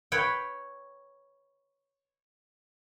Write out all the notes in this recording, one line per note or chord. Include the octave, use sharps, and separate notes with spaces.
B4 C#5 G5